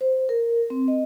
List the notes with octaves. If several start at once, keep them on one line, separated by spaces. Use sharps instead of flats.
C5
A#4
C4
D#5